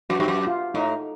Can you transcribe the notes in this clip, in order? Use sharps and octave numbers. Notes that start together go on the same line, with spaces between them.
F#2 F#4
G2 G4
F#2
F4
A2 D#4